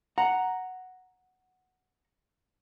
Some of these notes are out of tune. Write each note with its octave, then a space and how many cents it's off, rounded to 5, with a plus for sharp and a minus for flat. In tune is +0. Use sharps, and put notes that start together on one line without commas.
F#5 +0 A#5 +0